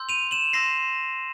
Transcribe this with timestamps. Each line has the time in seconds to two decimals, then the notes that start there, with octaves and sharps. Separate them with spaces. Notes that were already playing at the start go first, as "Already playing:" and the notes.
Already playing: C6 E6 G6
0.09 D#7 F7
0.31 E7 F#7
0.53 C6 E6 G6 A#6 C7